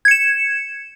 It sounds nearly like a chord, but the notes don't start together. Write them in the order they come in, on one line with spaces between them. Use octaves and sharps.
G#6 C#7 E7